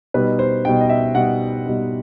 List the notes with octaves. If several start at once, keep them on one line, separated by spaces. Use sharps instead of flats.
B2 G3 D#4 B4
C5
B2 G3 D#4 G5
D#5
E5
B2 G3 D#4 F#5
B2 G3 D#4